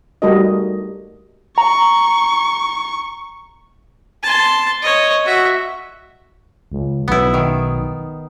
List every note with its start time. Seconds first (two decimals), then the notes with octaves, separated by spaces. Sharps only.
0.22 G3 A3 D#4 F#4 A#4 D#5
1.58 A#5 C#6
4.23 A5 C6
4.82 C#5 D#5
5.25 F#4 E5
6.72 C#2
7.08 B1 B3 E4
7.34 D#3